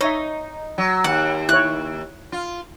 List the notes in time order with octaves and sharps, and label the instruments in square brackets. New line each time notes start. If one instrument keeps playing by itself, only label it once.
[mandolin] D#4 [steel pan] C#5 E5
[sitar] F#3
[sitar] D#2 [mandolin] F#5
[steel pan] E4 C#5 [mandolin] F#6
[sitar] F4